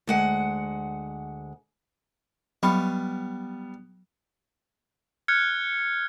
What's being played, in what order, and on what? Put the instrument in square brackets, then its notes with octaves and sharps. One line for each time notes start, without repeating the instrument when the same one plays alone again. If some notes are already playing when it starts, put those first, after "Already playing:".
[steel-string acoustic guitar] D2 G#3 F#5
[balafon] F#3 B5 [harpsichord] G3 F5 C#6 [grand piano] B3
[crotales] F6 F#6 G#6 C#7